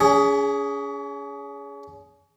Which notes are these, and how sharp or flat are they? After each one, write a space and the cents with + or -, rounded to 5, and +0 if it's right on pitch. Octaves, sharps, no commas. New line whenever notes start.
C#4 +35 G#4 +0